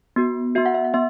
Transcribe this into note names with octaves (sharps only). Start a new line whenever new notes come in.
B3 F#4
B3 F#4 E5
F#5
E5
F#5
B3 E5